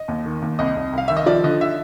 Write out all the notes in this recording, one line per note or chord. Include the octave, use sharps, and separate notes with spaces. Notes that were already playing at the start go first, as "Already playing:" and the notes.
Already playing: D#5
D#2
D#3
D#2
C2 D#5
C2
C2 F5
D#3 E5
D#5
F3 D5
D3 D#5
E5